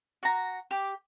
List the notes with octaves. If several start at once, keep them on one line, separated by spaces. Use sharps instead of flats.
F#4 A#5
G4 D6